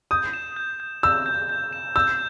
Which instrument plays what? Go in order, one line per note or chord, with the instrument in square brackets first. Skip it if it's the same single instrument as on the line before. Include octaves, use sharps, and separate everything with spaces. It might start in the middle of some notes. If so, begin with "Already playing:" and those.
[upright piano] D#6 [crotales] G6
[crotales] E7
G6
G6
[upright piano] E6 [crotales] G6
[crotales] G6
G6
E7
[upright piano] E6 [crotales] G6